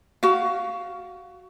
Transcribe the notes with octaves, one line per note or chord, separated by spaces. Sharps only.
F#4 F5